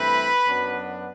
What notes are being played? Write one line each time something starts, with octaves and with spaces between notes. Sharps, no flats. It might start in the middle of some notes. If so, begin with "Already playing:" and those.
Already playing: G2 E3 A3 C4 B4 B5
F#2 F#3 B3 D4